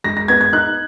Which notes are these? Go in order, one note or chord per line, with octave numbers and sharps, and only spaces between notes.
G#3 A#6
A#6
B3 G#6
G#6
D#4 F#6